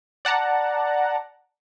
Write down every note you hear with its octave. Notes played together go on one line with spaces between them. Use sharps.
D5 F#5 A5 A#5